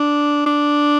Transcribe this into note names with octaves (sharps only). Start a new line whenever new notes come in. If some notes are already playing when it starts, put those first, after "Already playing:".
Already playing: D4
D4